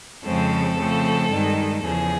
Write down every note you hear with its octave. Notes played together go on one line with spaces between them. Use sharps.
F2 C#3 F3 G#3 C4 A4
C#3 F3 A3 C4
G2 D#3 G#3
E2 C#3 F3 G#4